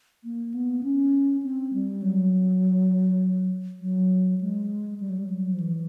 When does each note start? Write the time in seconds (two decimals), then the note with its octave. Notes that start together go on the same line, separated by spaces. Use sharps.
0.24 A#3
0.54 B3
0.83 C#4
1.43 C4
1.73 G3
2.02 F#3
3.81 F#3
4.41 G#3
5.00 G3
5.10 F#3
5.18 G3
5.30 F#3
5.54 F3
5.60 E3